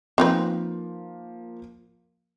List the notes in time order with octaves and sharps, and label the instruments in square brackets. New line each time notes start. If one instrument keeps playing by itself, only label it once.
[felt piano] F3 A#3 [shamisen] C4 D#4 B4